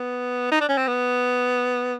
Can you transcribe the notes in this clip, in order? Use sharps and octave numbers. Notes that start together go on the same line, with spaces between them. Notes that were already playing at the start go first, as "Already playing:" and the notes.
Already playing: B3
D#4
D4
C#4
C4
B3